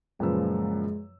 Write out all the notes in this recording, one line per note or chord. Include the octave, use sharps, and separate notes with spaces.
F#2 A#2 C#3 F3 G#3 B4 E6